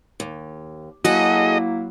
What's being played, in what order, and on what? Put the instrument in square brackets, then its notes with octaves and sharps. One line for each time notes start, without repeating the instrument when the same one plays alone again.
[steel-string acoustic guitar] D#2
[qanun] F#3 [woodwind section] A#3 E4 [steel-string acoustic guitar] F#4 G#4 A4 [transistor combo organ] D#5